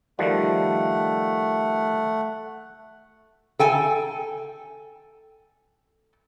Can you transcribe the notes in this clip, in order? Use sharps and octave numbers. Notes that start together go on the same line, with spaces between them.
D#3 F3 G3 A3 F#5
A4 G5 G#5